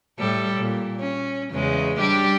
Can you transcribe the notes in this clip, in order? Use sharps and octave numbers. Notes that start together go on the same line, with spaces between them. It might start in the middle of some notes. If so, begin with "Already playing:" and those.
A2 G3 A4
A#2
C#4
E2 C#3 G#3
G3 D4 G4